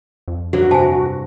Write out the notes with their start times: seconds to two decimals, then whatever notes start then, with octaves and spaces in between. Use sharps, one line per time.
0.28 F2
0.53 G2 D3 F#3 F#4
0.71 C3 G#5 A5